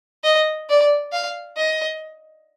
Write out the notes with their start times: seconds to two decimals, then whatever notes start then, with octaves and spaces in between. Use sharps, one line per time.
0.24 D#5
0.69 D5
1.13 F5
1.57 D#5